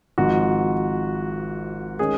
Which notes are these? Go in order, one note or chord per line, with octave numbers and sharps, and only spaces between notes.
G#1 G#2 F3 F#4
D#3 G#3 C#4 G#4